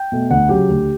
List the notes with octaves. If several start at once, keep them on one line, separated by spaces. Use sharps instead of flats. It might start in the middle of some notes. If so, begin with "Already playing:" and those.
Already playing: G5
B2 A3
D2 F#5
C#3 F#3 G4
D2